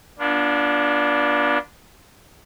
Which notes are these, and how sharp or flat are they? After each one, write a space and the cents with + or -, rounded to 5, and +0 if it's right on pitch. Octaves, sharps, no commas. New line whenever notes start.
B3 -40 D4 -5 F4 -10